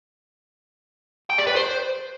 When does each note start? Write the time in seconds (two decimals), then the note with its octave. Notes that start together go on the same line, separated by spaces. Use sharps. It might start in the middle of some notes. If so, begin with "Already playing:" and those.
1.30 G5
1.39 D5
1.47 B4
1.56 C5